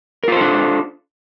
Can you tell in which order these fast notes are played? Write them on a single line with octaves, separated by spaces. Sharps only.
A#4 F4 C5 A4 D4